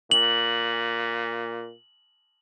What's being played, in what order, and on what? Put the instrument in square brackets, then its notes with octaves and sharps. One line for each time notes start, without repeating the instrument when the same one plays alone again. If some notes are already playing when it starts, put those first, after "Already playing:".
[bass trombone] A#2 [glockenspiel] F#7